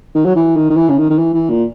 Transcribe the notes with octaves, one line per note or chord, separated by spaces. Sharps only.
D#3
F#3
E3
D#3
D#3
E3
C#3
D#3
D#3
E3
E3
A#2